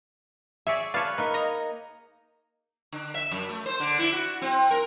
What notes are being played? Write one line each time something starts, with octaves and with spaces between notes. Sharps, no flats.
G#4 C#5 D5 E5
B4 C#5 D5 F5 A5
A#3 D#4 B4
D#5 A#5
D3
E5
F#2
A3
C5
D3
E4
F#4
C4
A#4